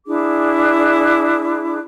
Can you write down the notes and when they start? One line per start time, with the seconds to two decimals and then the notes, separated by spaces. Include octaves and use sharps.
0.06 D4 E4 G#4 D6